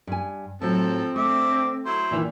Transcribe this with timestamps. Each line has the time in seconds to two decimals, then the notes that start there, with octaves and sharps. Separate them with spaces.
0.07 G2 G#5
0.62 A2 F3 F#3 C4 A4 A5
1.16 D3 A3 E5 D6
1.86 F#3 E4 C5
2.11 A#2 D#3 E3